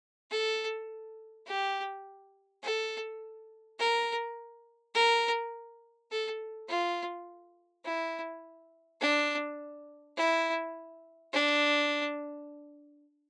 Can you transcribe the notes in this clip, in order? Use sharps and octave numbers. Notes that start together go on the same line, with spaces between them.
A4
G4
A4
A#4
A#4
A4
F4
E4
D4
E4
D4